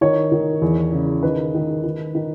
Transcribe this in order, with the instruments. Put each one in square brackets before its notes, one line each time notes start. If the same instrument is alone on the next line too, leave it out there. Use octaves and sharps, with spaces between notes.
[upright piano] D#3 C#5
D#3
E2
C#3
D#3 B4
D#3
D#3
D#3